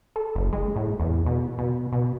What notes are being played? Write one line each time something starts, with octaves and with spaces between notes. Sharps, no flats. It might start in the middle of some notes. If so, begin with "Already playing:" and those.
A4
F#1
G#3
A2
E2
B2
B2
B2